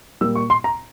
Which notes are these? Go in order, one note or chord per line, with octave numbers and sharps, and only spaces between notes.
A#2 G3 A#3 E6
C#6
C6
A#5